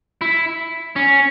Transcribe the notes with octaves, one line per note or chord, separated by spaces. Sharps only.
E4
C#4